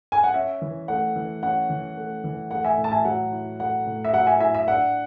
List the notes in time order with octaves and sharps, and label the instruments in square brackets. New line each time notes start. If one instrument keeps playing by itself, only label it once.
[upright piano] G#5
F#5
[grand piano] C#4 [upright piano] E5
[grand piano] E3
[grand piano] A3 [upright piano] F#5
[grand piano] E3
[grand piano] C#4 [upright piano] F#5
[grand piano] E3
A3
E3
[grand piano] A3 [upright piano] F#5
[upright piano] E5 G#5
[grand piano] A2
[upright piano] A5
E5 G#5
[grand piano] F#3 [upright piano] F#5
[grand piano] E4
[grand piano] A3 [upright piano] F#5
[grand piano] A2
[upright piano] E5
[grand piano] F#3 [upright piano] F#5
[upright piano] E5 G#5
[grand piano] E4 [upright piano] E5 G#5
[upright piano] E5
[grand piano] D4 [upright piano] F#5